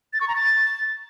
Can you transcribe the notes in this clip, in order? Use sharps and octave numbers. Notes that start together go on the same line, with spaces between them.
A6
C#6
A#5
A6